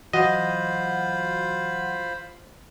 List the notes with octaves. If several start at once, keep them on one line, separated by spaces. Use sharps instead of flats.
E3 F#3 F4 F#4 C5 D#5 F#5 B5